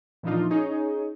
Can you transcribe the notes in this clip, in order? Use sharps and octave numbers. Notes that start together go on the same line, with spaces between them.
A#2 E3 F3 D4 D#4 F4
C#4 D#4 G#4 C#5